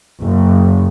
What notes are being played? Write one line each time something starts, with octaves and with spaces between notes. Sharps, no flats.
F#1